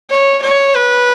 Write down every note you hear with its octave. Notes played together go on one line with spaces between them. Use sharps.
C#5
C#5
B4